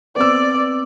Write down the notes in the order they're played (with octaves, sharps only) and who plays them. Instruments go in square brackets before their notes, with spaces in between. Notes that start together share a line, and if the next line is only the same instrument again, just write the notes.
[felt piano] B3 C4 E6 [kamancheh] D5